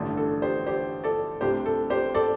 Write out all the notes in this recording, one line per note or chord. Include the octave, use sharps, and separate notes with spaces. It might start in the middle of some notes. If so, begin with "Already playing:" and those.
Already playing: A1 G2 D3 A3 D4
A4
G4 C5
G4 C5
A4 D5
C2 C3 A3 D4 G4 C5
A4
G4 C5
A4 D5